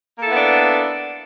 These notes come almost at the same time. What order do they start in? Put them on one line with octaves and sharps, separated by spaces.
A#3 A4 E4 B3 D4